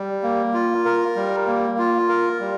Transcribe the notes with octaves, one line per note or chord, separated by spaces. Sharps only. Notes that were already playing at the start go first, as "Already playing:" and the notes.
Already playing: G3
A#3
F4
A#4
G3
A#3
F4
A#4
G3